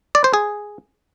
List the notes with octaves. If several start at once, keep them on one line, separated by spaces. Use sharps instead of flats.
D5
C5
G#4